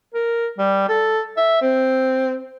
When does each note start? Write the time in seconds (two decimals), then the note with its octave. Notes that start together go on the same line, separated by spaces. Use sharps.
0.14 A#4
0.58 G3
0.89 A4
1.37 E5
1.61 C4